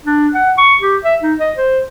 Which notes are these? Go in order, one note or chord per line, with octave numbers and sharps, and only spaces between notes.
D4
F#5
C#6
G4
E5
D#4
D#5
C5